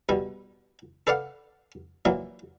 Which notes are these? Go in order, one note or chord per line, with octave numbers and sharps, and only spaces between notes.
E2 B2 G3
A4 B4 D5 F5 F#5
A#2 E3 F#3